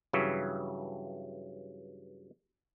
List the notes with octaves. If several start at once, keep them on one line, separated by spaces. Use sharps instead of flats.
G2 C#3 E3 F#3